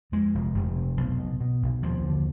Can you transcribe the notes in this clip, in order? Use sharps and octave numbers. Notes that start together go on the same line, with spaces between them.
F2 G#3
F1
F1
C3
B1
B2
B2
B1
D#2 F3
D3